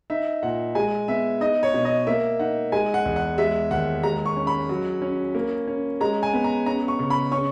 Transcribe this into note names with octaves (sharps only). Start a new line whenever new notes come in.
D#4 E5
A#2 F#5
G#3 G#5
B3 E5
D#4 D#5
C#5
B2
D#5
A#3 E5
D#4 F#5
G#3 G#5
F#5
E2
F#5
G#3 E5
D#2 F#5
G#3 A#5
C#6
C#4
B5
F#3
C#4
A#3
C#4
G#3 A#5
G#5
B3
A#5
C#4 A#5
C#6
C#3
B5
C#4 C#6